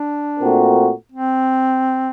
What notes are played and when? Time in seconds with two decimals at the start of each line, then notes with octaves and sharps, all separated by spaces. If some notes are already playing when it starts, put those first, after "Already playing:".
Already playing: D4
0.40 A#2 A3 C4 F#4 A#4
1.12 C4